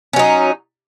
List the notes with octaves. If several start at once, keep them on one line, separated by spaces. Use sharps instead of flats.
F#3 C#4 D#4